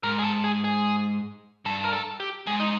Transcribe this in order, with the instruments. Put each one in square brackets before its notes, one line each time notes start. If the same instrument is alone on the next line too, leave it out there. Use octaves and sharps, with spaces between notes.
[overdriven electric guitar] G#2 [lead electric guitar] A#4
[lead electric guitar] G#4
A4
G#4
G#4
[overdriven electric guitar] G2 [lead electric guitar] A4
[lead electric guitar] A#4
A4
G4
[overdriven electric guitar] G#2 [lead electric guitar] G#4
[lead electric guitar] D#4